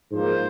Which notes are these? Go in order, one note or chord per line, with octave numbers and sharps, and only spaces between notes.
G#2 F3 A#3 C5